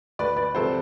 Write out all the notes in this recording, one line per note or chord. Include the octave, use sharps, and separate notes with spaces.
D2 B4 D5
B4 D5
C3 F3 A4 C5